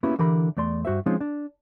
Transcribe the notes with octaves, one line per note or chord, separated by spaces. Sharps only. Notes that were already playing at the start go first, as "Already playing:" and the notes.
A#3 B3 C#4 E4 F#4 G4
D3 E3 G4 A#4 B5
E2 A3 D5 C6
G2 F#4 C5 E5
F3 G#3 C4 C#4 D#4 F4
D4